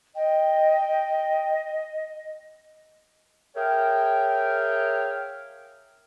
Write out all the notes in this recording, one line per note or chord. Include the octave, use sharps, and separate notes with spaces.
D#5 G5
G#4 A#4 C#5 E5 F5 G5